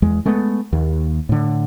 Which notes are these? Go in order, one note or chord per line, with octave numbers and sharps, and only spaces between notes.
E2 G#3
G#3 A3 B3
D#2
A2 D3